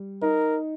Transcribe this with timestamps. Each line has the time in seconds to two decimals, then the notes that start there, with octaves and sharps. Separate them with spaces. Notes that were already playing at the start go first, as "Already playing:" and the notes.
Already playing: G3
0.22 D#4 A#4